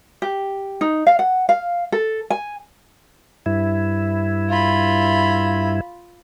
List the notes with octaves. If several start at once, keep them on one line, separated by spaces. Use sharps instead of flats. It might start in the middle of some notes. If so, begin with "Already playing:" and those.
G4
D#4
F5
F#5
F5
A4
G#5
G2 E4
F4 B5